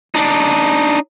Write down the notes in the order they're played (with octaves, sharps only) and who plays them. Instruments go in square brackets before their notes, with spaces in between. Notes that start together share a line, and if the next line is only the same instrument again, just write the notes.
[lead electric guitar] D4 D#4